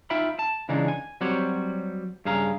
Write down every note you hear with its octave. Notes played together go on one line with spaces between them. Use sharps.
D#4 F4 E5 G5 B5
A5
C#3 E3 G#3 D4 D#4
G#5
F#3 G3 C4 F#4 G4 C#5
G2 C#3 G#4 F5 A#5